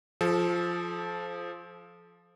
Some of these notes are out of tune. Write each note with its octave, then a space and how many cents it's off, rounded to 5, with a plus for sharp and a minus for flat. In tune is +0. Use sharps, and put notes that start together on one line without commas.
F3 +0 A4 -35